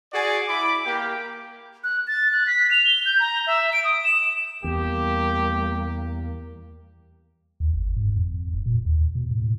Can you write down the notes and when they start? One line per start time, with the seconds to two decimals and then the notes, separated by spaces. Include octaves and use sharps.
0.13 F#4 G#4 D5 G#5
0.47 E4 B5 D6
0.85 A#3 G4
1.84 F#6
2.07 A6
2.32 F#6
2.47 B6
2.71 F7
2.85 G7
3.06 G6
3.20 A#5
3.47 E5
3.73 D7
3.84 D#6
4.04 E7
4.64 E2 G3 A#3 G4
7.60 D#2
7.74 G1
7.96 G#2
8.17 F2
8.54 E1
8.66 A#2
8.85 D#2
9.15 B2
9.31 A2